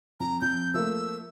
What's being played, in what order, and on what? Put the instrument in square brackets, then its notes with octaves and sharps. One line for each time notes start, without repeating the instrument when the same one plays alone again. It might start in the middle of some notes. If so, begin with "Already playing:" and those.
[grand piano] F2 [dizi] A#5
[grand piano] F2 [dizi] G6
[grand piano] F3 A3 A#3 [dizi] E6